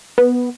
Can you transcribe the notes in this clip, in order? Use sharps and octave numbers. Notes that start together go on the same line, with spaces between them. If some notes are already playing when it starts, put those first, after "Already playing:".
B3